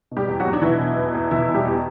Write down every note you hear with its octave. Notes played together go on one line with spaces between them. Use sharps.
B2
G3 G4
E2
F#3 F#4
E2
D4
B2 E3 E4
B2
E2
E2
B2 E3 E4
B2
G3 G4
E2